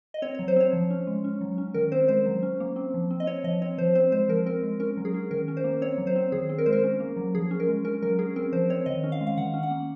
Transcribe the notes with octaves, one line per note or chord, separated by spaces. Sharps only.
D#5
C4 C#5
F#3 C#5
C5
C4 C#5
F3
C#4
G#3
C#4
F#3
C#4
D#3 A#4
C4 C5
G#3 C5
F#3
C#4
A#3
C4
F3
C4
D#5
C4 C#5
F3 D#5
C4 C#5
F3 C5
C4 C5
G#3 C5
F3 A#4
C4 A#4
G#3
C#4 A#4
F#3
G#4
C#4
D#3 A#4
C#4
C5
A#3
C4 C#5
F#3
C5
C4
D#3 G#4
C4
A#4
G#3 C5
A#4
C#4
A#3
F#3
F3 G#4
C#4
A#4
G#3
C#4 A#4
F#3 A#4
C#4 G#4
C4 A#4
F3 C5
C4 C#5
D#3 D#5
C#4
F5
G#3
F5
D#3 F#5
C#4
F#5
A#3